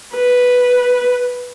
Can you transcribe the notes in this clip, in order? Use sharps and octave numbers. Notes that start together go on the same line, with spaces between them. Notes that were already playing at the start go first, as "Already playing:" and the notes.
B4